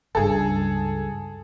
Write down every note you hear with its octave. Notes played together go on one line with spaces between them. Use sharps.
C#2 G2 G#4 A4